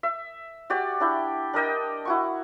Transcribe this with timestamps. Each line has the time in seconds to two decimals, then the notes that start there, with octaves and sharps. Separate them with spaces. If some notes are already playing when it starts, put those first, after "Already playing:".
0.03 E5
0.70 F#4 G4 D5
1.00 D4 E4 G5
1.54 D4 A#4 D#5 G5
2.05 E4 F#4 C#6